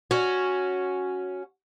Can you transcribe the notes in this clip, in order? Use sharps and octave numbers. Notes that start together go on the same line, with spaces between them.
C#4 F#4